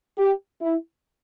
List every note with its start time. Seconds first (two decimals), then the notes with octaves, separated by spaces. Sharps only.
0.18 G4
0.61 E4